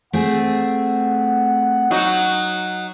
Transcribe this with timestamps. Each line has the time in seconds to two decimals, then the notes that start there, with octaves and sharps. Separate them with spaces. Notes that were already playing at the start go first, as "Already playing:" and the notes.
0.13 A3 C4 G#4 F#5
1.91 F#3 D#4 F#4